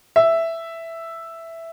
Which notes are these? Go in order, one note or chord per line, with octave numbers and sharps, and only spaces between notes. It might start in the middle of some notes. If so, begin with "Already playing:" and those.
E5